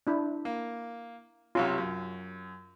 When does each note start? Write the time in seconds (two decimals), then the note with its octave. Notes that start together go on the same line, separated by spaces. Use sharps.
0.07 D4 E4
0.45 A#3
1.55 B1 C3 C#4 F4
1.78 F#2